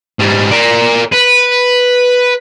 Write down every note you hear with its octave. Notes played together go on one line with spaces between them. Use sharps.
G#2 G3
A#4 D5
B4